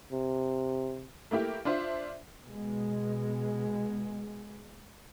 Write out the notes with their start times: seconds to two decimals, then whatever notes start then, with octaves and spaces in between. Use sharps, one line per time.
0.12 C3
1.31 A3 A#3 E4 G4 A#4
1.65 D4 F4 C5 E5
2.44 B2 G#3